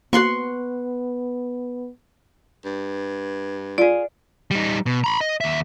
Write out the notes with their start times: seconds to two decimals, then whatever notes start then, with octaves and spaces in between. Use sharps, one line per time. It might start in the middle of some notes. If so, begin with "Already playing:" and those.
0.13 A#3 B3 F#4 F#5 C6 C#6
2.65 G2
3.78 F4 G#4 D5
4.51 G3 D#4
4.86 B2
5.04 A#5 B5
5.21 D#5
5.41 D#2 E5